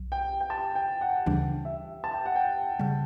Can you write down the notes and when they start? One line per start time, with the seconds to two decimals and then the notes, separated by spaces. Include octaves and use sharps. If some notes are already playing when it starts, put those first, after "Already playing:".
Already playing: B1 F#3
0.12 G5
0.41 G5
0.50 A5
0.75 G5
1.01 F#5
1.26 D2 C#3 E3 G3 D4
1.65 E5
2.04 A5
2.14 G5
2.26 F#5
2.36 G5
2.79 C#3 G3